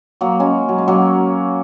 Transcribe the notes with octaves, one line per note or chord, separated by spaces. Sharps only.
F#3 A#3
G#3 C#4
F#3
G#3
F#3 A#3